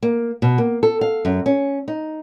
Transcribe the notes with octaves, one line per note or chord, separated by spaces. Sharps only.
A#3
B2
A#3
A4
F5
F#2
C#4
D#4